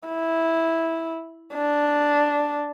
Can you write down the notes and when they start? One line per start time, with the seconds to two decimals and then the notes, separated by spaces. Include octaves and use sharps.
0.09 E4
1.54 D4